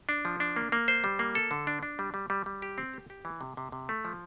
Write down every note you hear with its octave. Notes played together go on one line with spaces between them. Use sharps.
D4
F3
D4
A#3
A#3
C5
G3
A#3
A4
D3
D4
D4
G3
G3
G3
G3
G4
C4
G4
G4
E3
C3
C3
C3
A3
F3